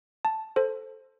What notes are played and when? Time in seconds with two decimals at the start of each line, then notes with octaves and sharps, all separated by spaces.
0.25 A5
0.56 A4 C5